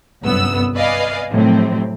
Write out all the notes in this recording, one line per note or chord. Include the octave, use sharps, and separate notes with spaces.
G1 C2 F#2 B3 E6
B4 D5 D#5 F5 G#5
A2 C3 D#3 F3 F#3 C4